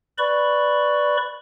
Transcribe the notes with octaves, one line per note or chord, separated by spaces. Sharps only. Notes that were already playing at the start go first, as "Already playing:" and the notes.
B4 D5 B5 C#6